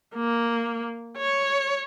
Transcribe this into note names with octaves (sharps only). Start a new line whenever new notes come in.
A#3
C#5